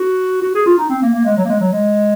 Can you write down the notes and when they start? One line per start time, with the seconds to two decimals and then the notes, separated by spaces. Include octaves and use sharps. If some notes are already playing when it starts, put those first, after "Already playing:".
Already playing: F#4
0.42 F#4
0.55 G#4
0.66 F4
0.78 D#4
0.90 C4
1.02 A#3
1.14 A#3
1.25 G#3
1.37 F#3
1.45 A#3
1.49 G#3
1.60 F#3
1.73 G#3